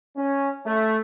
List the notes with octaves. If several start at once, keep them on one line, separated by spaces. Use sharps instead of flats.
C#4
A3